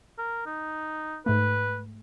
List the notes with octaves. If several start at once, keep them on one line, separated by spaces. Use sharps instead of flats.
A#4
D#4
G#2 A3 B4